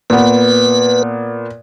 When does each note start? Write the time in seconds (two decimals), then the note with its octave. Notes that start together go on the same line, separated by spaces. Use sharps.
0.10 A#2 B3 B4